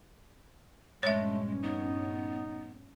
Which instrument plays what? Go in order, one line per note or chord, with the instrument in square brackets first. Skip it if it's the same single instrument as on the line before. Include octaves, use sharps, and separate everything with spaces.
[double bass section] A#1 G2 C#4 [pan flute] G#3 [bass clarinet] A3 [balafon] C#5 E5
[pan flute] B3 [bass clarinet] D#4